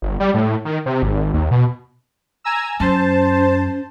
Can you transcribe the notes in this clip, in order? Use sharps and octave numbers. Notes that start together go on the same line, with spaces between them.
G1
G3
A2
D#3
C3
G#1
D#2
B2
G#5 A#5 E6
F#2 C#4 C5 A5